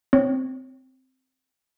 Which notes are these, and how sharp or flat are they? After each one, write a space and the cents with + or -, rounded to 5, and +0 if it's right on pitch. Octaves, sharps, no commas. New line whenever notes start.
C4 -5 C#5 +0